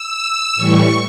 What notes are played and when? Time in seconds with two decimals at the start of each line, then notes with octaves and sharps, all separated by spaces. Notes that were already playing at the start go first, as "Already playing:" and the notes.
Already playing: E6
0.55 A2 E3 G3 C#6